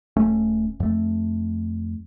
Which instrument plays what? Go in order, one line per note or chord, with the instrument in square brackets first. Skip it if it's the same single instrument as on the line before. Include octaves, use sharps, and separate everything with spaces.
[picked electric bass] D#1 A3 C#4
F2 A3